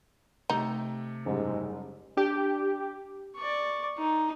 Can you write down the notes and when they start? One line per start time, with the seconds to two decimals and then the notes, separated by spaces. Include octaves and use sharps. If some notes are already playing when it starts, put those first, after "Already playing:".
0.50 C3 A3 D#4
1.26 F#1 G#2 G3
2.17 D4 G4
3.36 D5 C#6
3.98 D#4